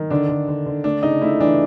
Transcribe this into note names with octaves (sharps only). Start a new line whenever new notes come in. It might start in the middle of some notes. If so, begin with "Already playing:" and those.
Already playing: D#3
D3 D4
D3
D3
D3
A3 D4
C#3 D#4
A3 E4
E3 D4